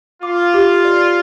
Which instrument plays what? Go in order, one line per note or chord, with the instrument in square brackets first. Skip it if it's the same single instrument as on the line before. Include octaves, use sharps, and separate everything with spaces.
[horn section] F4 [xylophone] D6
[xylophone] G4
D5